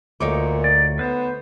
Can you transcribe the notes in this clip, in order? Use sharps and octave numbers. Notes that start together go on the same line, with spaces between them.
D2 A#2 D#4 C#5 D6
D5
B3 B4 C5